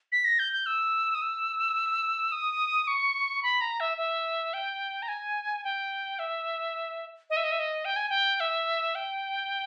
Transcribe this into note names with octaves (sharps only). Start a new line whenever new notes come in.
B6
A#6
G6
G6
E6
D#6
E6
D#6
C#6
B5
A#5
E5
E5
G5
A#5
G#5
G5
E5
D#5
E5
D#5
E5
D#5
G5
G#5
G5
E5
G5